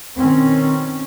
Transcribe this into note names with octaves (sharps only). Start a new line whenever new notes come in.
B2 D#3 C4 C#4